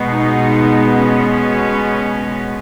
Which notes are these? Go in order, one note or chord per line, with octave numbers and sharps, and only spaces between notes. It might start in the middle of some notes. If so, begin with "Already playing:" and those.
Already playing: B2 G#3 B3
D#4
C#4